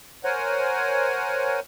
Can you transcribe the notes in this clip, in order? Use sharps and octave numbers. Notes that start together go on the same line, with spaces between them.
A#4 C5 C#5 F#5 G#5